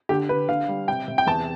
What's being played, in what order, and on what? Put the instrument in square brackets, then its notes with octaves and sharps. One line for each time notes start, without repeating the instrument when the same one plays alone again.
[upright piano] D3 G4
D3 B4
D3 F5
G3
C3 G5
C3
G5
E2 A5